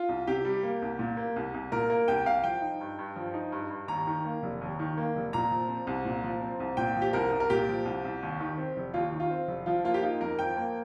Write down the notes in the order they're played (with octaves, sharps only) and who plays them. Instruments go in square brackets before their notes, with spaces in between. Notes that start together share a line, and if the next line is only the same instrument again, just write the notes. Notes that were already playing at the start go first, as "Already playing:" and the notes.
Already playing: [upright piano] F4
C2
C3 G4
G3
A#3
C2
A#2
A#3
C2
C2
A#2 A#4
A#3 A#4
C2 G5
C2 F5
F3 G5
D#4
G2
G2
F3
D#4
G2
G2
D#2 A#5
D#3
A#3
F1
D#2
D#3
A#3
F1
A#2 A#5
F3
C4
C2
A#2
F3
C4
C2
A#2 G5
F3
G4
C2 A#4
C2
A#4
A#2 G4
F3
C2
C2
D#2
D#3
C4
F1
D#2 F4
D#3
F4
C4
F1
F3 F4
A#3 F4
G4
D#4 F4
F2 A#4
F3 G5
A#3